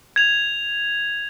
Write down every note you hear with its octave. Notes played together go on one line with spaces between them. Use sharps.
G#6 F7